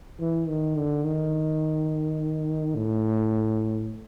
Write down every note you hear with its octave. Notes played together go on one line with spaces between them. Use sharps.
E3
D#3
D3
D#3
A2